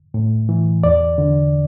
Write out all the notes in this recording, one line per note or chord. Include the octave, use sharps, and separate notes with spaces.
A2
E3
E2 D5
D3